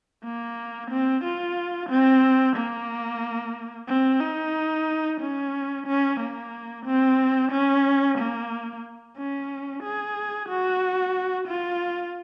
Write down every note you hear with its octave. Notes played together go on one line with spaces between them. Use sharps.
A#3
C4
F4
C4
A#3
C4
D#4
C#4
C#4
A#3
C4
C#4
A#3
C#4
G#4
F#4
F4